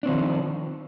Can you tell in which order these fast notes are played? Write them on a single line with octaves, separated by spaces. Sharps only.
D4 C4 D#3 F3